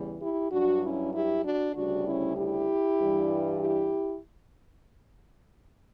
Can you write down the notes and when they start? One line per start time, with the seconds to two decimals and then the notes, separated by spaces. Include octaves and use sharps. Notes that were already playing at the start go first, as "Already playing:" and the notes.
Already playing: E2 C#3 E3 G3
0.21 E4 G4
0.52 G2 F#3 D4 F#4
0.83 C#4 E4
1.14 E4 G4
1.44 D4 F#4
1.75 D2 C#3 G3 D4 F#4
2.06 C#4 E4
2.37 E4 G4
2.99 G2 E3 G3
3.60 E4 G4